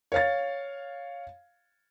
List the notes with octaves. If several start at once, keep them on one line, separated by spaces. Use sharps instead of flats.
C#5 F5 A6